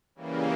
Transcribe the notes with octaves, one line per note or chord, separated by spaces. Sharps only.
C#3 E3 G3 A#3